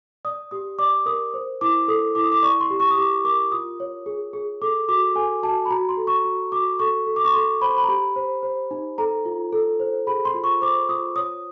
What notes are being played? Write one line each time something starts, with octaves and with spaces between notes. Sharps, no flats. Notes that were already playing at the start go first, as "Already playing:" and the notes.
D5 D#6
G4 D#6
D5 D6
A#4 D#6
C5
E4 D6
A4 D#6
E4 D6
D#6
D6
D5 C#6
C6
G4
C#6
D#6
G4 D6
A#4 D6
F4 D#6
C#5
G#4
G#4
A4 D6
F#4 D6
A4 G#5
F#4 A5
B5
F#4 A#5
C6
A4
C#6
F#4
F#4 D6
A4 C#6
A4
D6
C#6
A4 C6
C5 B5
C6
B5
A#5
G4 B5
C5
C5
D#4
A4 A#5
F4
A4
C5
G#4 B5
C6
F4
C#6
C5 D6
F4 D#6
C#5 D#6